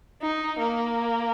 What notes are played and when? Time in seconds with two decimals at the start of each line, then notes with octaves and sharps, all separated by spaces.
0.22 D#4
0.59 A#3